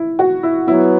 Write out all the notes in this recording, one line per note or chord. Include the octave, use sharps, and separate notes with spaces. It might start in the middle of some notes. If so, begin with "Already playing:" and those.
Already playing: E4
F#4
E4
F#3 B3 E4